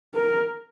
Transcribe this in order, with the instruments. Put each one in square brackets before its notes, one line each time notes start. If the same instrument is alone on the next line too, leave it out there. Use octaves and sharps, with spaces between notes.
[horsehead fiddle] A#4